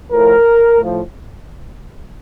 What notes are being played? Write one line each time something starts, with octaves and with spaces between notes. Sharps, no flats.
A2 F3 A#4
A2 F3